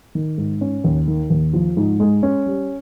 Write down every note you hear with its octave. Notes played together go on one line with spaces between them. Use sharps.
D#3
G#2
C#4
D#2
D#3
D#2
F3
G#2
G#3
C#4
G3